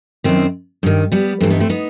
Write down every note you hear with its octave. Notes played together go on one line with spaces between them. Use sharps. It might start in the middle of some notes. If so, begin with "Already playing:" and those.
F#2 D#3 C4 E4
G2 D#3
G3 B3
G2 E3 A3 C4
B3 D#4
A3 C4
B3 D#4